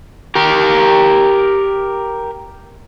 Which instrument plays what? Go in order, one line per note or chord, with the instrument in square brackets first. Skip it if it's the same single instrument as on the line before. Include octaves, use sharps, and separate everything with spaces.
[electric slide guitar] G4 A#4